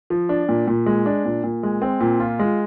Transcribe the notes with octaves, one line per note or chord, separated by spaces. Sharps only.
F3
D4
A#2
A#2
G#3
D4
A#2
A#2
G#3
C4
A#2
F4
G#3